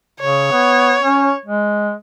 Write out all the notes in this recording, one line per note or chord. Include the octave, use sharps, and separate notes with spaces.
C#3 C#5
B3
C#4
G#3